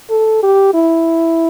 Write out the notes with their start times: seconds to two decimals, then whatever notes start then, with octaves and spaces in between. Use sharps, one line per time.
0.10 A4
0.43 G4
0.74 E4